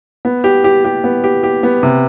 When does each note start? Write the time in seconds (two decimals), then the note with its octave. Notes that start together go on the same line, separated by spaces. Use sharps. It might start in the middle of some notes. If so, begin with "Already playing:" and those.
0.25 B3
0.44 G4
0.64 G4
0.85 G4
1.04 B3
1.24 G4
1.43 G4
1.63 B3
1.83 C3